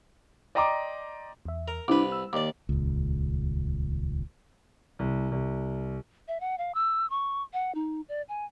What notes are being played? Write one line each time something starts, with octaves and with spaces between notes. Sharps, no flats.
D5 D#5 G5 A#5 C6 D6
E2 E5
A#4
C2 D4 E4 B4 D6
E6
D#2 D5 D6
D#1 C#2
C2
C2
E5
F#5
F5
E6
C#6
F#5
D#4
D5
G#5